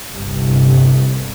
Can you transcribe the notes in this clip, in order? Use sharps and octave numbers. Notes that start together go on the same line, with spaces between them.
G1 C2 G2